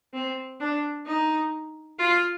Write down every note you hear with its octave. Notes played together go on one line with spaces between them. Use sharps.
C4
D4
D#4
F4